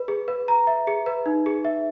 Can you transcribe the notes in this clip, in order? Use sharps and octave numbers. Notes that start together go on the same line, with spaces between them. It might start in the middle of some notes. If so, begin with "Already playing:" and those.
Already playing: B4
G#4
B4
A#5
E5
G#4
B4
D#4
G#4
E5